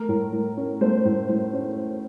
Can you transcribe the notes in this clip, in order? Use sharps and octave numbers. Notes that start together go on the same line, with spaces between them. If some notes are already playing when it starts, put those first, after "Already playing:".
Already playing: A3 A#4
A2
A2
C#4
A3 C5
A2
A2
C#4